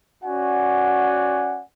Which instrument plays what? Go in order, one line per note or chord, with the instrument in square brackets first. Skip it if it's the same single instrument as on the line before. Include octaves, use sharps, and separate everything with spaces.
[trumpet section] C#4 F#4 D5 F#5 G#5